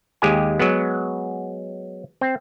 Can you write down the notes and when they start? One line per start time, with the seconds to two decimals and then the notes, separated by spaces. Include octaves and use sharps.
0.22 D#2 G#3 G4 G#5
0.59 F#3 G#3 B3
2.21 C4